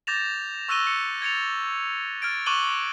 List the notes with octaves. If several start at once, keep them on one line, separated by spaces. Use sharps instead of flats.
D6 G6 A6 A#6 E7 F7
C#6 E6 F#6 A#6 D#7 G7
C#7
G#6 A6 C#7 F7
F6 G#6 A6 D7
C#6 D6 F#6 D#7 F#7 G7